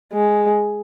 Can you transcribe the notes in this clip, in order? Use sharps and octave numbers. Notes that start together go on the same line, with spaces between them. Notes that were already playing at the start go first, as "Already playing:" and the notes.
G#3